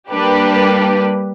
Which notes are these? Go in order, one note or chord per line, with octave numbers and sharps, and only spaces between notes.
G3 A#3 D4 G4 B4